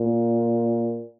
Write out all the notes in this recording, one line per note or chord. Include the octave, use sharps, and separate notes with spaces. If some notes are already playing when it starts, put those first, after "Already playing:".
Already playing: A#2